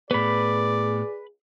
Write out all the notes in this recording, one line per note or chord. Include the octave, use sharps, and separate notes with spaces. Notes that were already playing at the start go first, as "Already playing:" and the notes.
A2 B3 G#4 B4 D5 B5